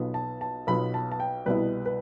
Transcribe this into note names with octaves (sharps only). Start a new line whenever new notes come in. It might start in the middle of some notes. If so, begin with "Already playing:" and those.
Already playing: B1 B2 B3 F4
A5
A5
B1 B2 B3 F4 B5
A5
A5
G5
C2 B2 G3 B3 E4 B4
B4